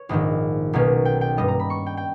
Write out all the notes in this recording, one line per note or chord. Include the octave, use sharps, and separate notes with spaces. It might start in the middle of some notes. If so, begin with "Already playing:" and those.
Already playing: C#5
A#1 G#2 D#3 D#5
B1 B2 A#3 C#4
G5
G5
G2 G3 B3 D#5
A#5
B5
C#6
G5
G5